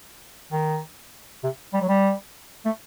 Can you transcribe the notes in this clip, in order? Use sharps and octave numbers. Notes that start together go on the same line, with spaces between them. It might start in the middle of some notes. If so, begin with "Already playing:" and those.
D#3
C3
G3
F#3
G3
A3